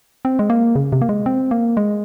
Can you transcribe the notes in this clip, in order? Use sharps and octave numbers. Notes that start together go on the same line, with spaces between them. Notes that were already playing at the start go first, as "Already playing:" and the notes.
C4
G#3
A#3
C#3
C3
A#3
G#3
C4
A#3
G#3